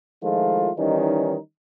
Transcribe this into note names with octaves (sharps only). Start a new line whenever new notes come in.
D#3 F3 G#3 A3 E4 F4
D#3 E3 G3 C#4 D#4